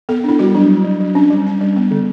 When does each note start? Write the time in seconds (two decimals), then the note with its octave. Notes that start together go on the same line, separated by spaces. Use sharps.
0.09 B3 A4
0.24 D4 E4
0.39 G3 F#4
0.55 F#3 D4
0.69 F#3
0.84 F#3
1.00 F#3
1.15 C#4 D4
1.30 G3
1.46 C#4
1.61 G3
1.76 B3
1.91 D3